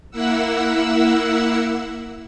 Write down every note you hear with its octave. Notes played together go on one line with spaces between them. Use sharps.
A#3 E4 F#5 E6